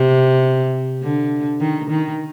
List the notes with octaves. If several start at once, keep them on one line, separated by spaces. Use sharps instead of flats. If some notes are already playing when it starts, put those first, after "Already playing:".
Already playing: C3
D3
D#3
D#3